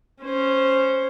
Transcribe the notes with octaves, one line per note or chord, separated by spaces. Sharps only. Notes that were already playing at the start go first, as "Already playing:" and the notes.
C#4 C5